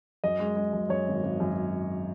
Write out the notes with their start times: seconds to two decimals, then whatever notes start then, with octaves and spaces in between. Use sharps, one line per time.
0.24 F#2 D#5
0.40 G#3
0.57 G#3
0.73 F#2
0.89 F#2 C#5
1.07 G#1
1.23 G#1
1.40 F#2